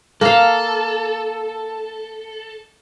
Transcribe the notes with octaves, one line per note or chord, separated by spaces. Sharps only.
A#3 A4 F5